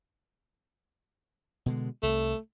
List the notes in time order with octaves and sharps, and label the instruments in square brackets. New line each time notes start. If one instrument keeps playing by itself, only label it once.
[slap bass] B2 D3 G#3
[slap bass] C2 [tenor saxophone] A3